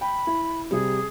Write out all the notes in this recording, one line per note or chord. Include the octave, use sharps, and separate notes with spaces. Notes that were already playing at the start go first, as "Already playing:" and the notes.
G5 B5
E4
C3 G3 G#4